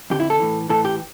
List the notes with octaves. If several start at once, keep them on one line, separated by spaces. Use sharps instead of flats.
F2 D3 G4
E4
A4
A2 E3
A2 E3 A4
G4